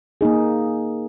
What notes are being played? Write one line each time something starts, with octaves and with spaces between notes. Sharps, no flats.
A#3 D#4 G#4